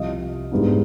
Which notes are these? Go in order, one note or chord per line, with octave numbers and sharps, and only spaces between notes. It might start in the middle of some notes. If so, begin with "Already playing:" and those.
Already playing: C2 C3 F3 D#5 F5
G#2 E3 G3 B3 D4